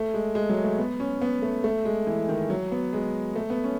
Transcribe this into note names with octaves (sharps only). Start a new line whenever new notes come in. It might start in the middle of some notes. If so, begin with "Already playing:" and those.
Already playing: A3
G#3
G#3
F#3
A3
B3
C#4
B3
A3
A3
G#3
E3
D#3
F#3
B3
G#3
A3
B3
C#4